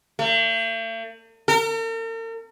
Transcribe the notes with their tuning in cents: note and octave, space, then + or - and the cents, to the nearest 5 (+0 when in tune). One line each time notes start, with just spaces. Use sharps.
A3 +45
A#4 -45